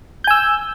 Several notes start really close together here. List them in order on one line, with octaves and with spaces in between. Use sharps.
G6 G#5 E6